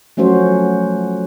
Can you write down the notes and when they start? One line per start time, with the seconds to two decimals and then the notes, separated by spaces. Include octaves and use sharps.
0.17 F3 F#3 A3 C#4 F#4 C5